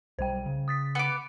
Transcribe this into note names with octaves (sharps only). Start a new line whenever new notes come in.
B1 G3 C5 G5
C#3
D#6 A6 B6
B3 D6 C#7